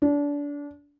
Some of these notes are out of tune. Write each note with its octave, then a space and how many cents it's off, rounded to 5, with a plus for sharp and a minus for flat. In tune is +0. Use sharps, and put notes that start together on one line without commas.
D4 -25